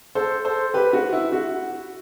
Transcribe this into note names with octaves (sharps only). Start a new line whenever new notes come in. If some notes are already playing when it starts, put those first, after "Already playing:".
A4 C5
A4 C5
G4 B4
F#4
E4
F#4